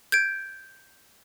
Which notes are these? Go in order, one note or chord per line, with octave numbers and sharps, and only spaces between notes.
G6 G#6 D7